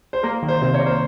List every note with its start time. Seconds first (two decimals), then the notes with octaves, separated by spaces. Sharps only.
0.13 C5
0.23 A#3 A#4
0.43 D#3
0.48 C5
0.62 C3 C5
0.74 C#5
0.80 A#3
0.86 C5